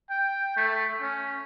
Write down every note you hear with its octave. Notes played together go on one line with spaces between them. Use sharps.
G5
A3
C#4